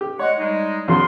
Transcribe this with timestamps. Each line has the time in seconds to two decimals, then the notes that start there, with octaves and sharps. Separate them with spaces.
0.01 G4
0.19 G#3 C#5 F#5
0.37 G3 G#3 D#4
0.88 E2 C#3 F#3 C6